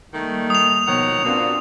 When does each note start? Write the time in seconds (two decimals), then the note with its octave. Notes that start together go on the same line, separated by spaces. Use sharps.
0.14 D#3 G3 A3 A#3 D#4
0.50 D#6 F7
0.87 B2 D#3 F3 C#5 F#5
1.25 B2 A#3 C4 D4 F4 F#4